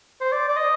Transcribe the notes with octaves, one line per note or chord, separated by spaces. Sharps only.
C5
D5
D5
D#5